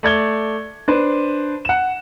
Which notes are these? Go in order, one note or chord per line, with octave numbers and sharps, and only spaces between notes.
A3 D5 G#6 G7
D4 B4 C5
F#5 E7